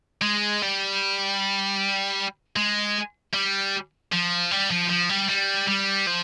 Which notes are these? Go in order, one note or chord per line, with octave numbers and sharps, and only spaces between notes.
G#3
G3
G#3
G3
F3
G3
F3
F3
G3
G3
G3
F3